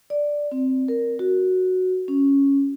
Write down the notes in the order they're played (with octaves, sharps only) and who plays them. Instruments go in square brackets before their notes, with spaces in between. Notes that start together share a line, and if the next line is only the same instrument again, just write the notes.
[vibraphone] D5
C4
A#4
F#4
C#4